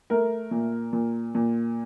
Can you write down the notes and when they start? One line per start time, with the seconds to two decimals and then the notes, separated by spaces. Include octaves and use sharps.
0.10 A3 A#4
0.51 A#2
0.93 A#2
1.35 A#2